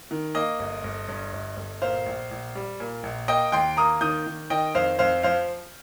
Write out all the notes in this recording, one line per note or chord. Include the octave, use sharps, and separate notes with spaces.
D#3
A#3 D#5
G1
G1
G2
G1
G1
A#2 C5 F5
A#1
A#1
G3
A#2
A#1
A#3 D#5 G5
D#2 G5 C6
A#3 A#5 D#6
D#3 D#6 G6
D#3
D#3 D#5 G5
F2 C5 F5
F2 C5 F5
F3 C5 F5